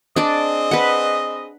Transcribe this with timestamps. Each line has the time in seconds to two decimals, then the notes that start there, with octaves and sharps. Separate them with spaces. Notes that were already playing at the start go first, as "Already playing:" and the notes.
0.16 C4 D4 G#4 D5 D#5
0.71 B4 F#5